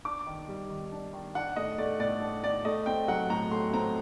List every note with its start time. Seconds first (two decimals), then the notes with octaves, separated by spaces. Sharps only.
0.05 D4 D6
0.26 D#3
0.48 G3
0.70 D#3
0.92 D4
1.13 D#3
1.35 D4 F#5
1.56 A2 D#5
1.78 A3 D5
1.99 A2 D5
2.21 D4
2.43 A2 D5
2.65 A3 D#5
2.86 C4 G5
3.08 F#3 F#5
3.30 A2 A#5
3.51 A3 C6
3.73 C4 A#5